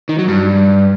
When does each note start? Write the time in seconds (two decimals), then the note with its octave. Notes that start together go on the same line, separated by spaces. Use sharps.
0.09 D#3
0.19 F#3
0.28 G2